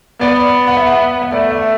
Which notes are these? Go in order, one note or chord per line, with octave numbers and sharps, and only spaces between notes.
B3 D5
D5
F#5
E5
F#5
E5
A3 D5
E5